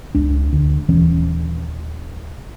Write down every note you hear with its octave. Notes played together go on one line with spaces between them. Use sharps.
C#2 D4
D2
D#1 E3 C#4